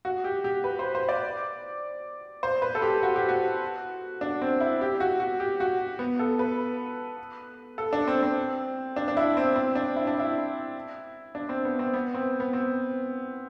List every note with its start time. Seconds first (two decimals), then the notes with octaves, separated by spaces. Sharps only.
0.05 F#4
0.24 G4
0.44 G4
0.64 B4
0.79 C5
0.95 C5
1.09 D5
2.43 C5
2.62 B4
2.75 A4
2.82 G4
3.03 F#4
3.16 G4
3.29 F#4
4.21 D4
4.42 C4
4.60 E4
4.81 G4
5.00 F#4
5.20 F#4
5.40 G4
5.60 F#4
5.99 B3
6.19 A4
6.39 B4
7.78 A4
7.93 D4
8.08 C4
8.23 C4
8.96 D4
9.08 D4
9.17 E4
9.37 C4
9.56 C4
9.75 D4
9.96 E4
10.07 D4
10.19 E4
11.35 D4
11.49 C4
11.65 B3
11.79 C4
11.93 B3
12.14 C4
12.40 B3
12.53 C4